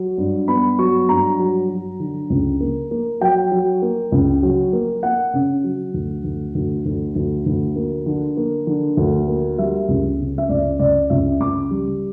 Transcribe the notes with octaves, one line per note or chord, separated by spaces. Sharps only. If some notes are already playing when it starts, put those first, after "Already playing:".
Already playing: F#3
G2
B3 B5
F#3 C#6
G2 A#5
F#3
F#3
D3
C#2
A#3
A#3
F#3 G5
F#3
A#3
C#2
F#3
A#3
A#3 F#5
C#3
F#3
D2
D2
D2
D2
D2
D2
A#3
D3
A#3
D3
D2
A#3
G3 E5
C#2
C#3
E5
C#2 D5
C#2 D5
C#2 E5
C#2 D6
G3